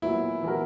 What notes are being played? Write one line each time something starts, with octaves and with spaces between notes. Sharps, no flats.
A#2 F#3 B3 E4
E3 B3 F#4 A#4